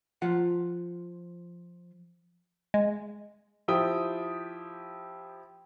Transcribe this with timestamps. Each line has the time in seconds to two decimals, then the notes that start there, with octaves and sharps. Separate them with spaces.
0.22 F3 F4 F#5
2.74 G#3
3.68 F3 E4 G4 G5 D#6